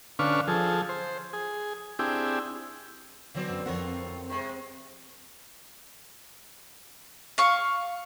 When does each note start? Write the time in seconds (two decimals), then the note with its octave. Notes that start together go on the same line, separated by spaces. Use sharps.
0.19 D3 C#4 D4 B4 F5 C#6
0.48 F3 G#4 A4
0.89 C5
1.33 G#4
1.99 C4 D4 E4 G4 G#4
3.34 D3 E3 F#3 B3 C4 D5
3.50 F#2
3.66 F2 C4 E4 F4 A#4 C#5 F#5
4.29 C3 G#3
7.38 F5 C#6